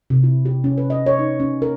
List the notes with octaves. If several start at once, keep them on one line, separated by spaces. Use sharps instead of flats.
C3
E4
G4
C#4
B4
D#5
C#5
D#4
C#4
A#4